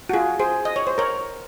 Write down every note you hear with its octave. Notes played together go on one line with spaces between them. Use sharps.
F#4
F4 G#4
G#4 C5
D#5
C#5
C5
A#4 C#5